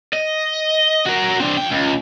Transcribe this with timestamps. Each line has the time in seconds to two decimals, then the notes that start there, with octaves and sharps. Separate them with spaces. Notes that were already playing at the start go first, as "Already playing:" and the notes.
0.13 D#5
1.06 F#4 A#4
1.40 C4 D4
1.57 F2 G5
1.72 C#2